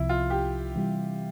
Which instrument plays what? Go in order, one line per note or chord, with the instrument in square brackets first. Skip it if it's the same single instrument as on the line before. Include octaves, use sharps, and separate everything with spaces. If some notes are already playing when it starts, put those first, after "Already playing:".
Already playing: [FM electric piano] C2 C3 F3 [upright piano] E4
[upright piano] F4
G4
[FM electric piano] C3 E3 G3